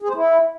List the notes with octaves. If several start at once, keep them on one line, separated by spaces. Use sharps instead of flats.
G#4
C5
E4